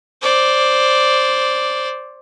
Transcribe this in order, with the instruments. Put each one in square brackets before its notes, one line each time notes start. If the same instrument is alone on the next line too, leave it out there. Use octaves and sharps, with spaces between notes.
[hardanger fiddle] C5 D5